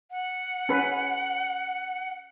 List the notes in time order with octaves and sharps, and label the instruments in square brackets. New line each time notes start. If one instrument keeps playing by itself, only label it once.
[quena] F#5
[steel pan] C#4 B4